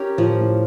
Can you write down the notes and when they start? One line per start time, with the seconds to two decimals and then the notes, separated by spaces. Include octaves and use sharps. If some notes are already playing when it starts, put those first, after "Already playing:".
Already playing: C#4 G4 A#4
0.18 A2 F3
0.41 A2